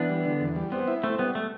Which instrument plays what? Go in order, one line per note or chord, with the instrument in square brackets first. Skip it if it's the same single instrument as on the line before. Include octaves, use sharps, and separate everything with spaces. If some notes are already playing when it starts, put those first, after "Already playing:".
Already playing: [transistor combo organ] E3 [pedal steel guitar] B3 D4
[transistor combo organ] G3
D3
E2
G3
[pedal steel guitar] B3 [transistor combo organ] C4
[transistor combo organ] E4
[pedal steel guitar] A3 [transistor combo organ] C4
[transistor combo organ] G3 [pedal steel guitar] B3
[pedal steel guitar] A3